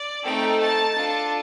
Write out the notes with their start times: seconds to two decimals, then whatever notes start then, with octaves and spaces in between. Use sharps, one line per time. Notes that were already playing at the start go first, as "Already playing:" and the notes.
Already playing: D5
0.25 A3 C4 D#4 A4 G5
0.61 A5
0.95 D4 F4 A4